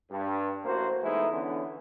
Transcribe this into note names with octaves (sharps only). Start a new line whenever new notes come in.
G2
A1 A#3 F#4 C5
E3 G#3 A3 B3 D#4 E4
D3 E3 B3 C#4